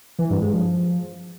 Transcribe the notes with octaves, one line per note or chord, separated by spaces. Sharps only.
E3
G2
G#3
F3